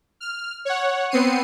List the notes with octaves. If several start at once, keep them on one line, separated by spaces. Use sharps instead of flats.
F6
C#5 F#5
B3 C4 C7 C#7 D#7